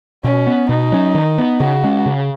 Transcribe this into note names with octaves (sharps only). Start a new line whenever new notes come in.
B2 C#4
B3
B2 D#4
F#3 C#4
D#3
B3
C#3 F#4
G#3 C#4
C#3